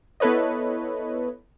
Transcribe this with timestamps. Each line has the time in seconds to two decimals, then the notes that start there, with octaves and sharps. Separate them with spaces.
0.20 B3 E4 A4 B4 C#5 D#5